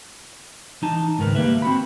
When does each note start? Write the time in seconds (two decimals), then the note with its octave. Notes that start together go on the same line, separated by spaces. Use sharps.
0.82 E3 D#4 A5
1.18 C#2 G#2 D#3 A#4 B4
1.35 G3 A#3 B4 E5
1.62 C4 F#4 B5